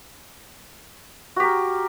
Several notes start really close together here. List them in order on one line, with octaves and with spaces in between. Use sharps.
F#4 G4 A#4